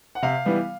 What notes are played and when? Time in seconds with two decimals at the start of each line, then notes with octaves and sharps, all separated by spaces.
0.15 F#5
0.22 C3 F5
0.45 E3 G3 B3